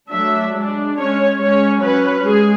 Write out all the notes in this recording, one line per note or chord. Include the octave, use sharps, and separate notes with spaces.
F#3 A3 D4 E5
G#3 D4
G#3 C#4 C#5
G#3 C#4 C#5
F#3 C#4 B4
G#3 G#4